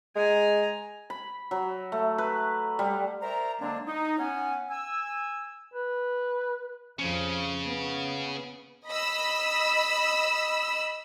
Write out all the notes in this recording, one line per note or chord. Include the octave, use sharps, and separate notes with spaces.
G#3 G#5 A#5
B5
F#3
A3
B4
G3
A#4 C5 D5 E5 A#5
D3 F#3 G#3 A#3 C4 D4
D#4
B3 C#4 C#5 F#5 G#5
G#5 E6
B4
F2 C#3 F3
B3
D#5 B5 E6